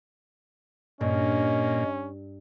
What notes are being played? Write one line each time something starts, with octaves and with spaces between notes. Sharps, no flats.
G2 A#2 C#4 D#5